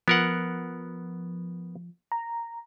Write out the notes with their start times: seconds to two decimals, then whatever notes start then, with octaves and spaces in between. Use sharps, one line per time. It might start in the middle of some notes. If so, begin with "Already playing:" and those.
0.08 F3 B3 A#4 F#5
2.12 A#5